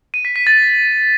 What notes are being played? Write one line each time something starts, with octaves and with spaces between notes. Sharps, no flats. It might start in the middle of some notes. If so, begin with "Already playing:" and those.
D#7
B6
B6
A6